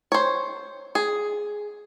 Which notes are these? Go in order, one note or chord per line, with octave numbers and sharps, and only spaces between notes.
C5 C#5
G#4